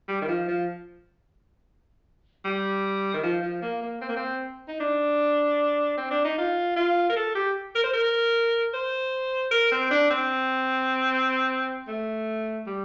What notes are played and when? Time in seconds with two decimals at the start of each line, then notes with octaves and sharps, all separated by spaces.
0.08 G3
0.22 D#3
0.28 F3
0.48 F3
2.45 G3
3.14 D#3
3.23 F3
3.42 F3
3.62 A#3
3.82 A#3
4.01 C4
4.08 A#3
4.16 C4
4.68 D#4
4.80 D4
5.98 C4
6.10 D4
6.25 D#4
6.38 F4
6.76 F4
7.10 A#4
7.16 A4
7.35 G4
7.75 A#4
7.84 C5
7.93 A#4
8.74 C5
9.51 A#4
9.72 C4
9.91 D4
10.10 C4
11.87 A3
12.67 G3